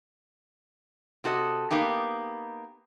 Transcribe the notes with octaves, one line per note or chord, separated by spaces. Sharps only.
C3 F#4 A4 D#5
A#3 B3 D#4 G4